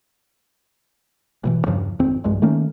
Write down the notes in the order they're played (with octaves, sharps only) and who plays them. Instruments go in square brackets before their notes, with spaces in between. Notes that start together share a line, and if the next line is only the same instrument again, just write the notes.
[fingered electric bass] A1 B2 E3
E2 G2 C#3 F3
G#1 F2 C4
E1 B1 G2 G#3
D#3 A3 A#3 C#4